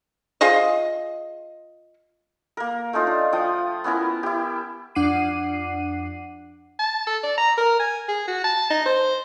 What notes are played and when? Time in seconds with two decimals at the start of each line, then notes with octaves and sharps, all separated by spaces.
0.41 F4 G#4 C5 D#5
2.57 A#3 A#4
2.93 A3 C#4 D#4 F4
3.07 D4
3.32 F3 G5 D#6
3.84 B3 C#4 E4 A#4
4.23 E4 G4
4.95 F2 D4 F#5 D6 C7 D#7
6.79 A5
7.07 A4
7.23 D5
7.38 A#5
7.58 A#4
7.80 G#5
8.08 G#4
8.28 F#4
8.44 A5
8.70 D#4
8.86 C5